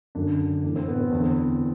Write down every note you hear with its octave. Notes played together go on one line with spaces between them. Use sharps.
F#2 D3 D4
A2 E3 D4
C4
B3
C4
E2 D3 D4
C4